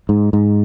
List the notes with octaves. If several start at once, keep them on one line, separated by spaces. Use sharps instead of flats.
G#2
G#2